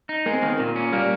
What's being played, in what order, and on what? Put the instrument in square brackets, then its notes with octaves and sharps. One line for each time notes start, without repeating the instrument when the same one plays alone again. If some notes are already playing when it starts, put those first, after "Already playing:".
[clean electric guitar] D#4
[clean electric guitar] G#3 [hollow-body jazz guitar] A#3
[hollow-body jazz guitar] C4
[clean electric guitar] D#3 [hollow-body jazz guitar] A#3
[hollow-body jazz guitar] C4
[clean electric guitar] A#2 [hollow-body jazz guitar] A#3
[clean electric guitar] C#4
[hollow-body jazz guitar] G3 [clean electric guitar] A#3